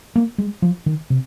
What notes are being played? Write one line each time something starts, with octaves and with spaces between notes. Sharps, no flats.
A#3
G#3
F3
D#3
C3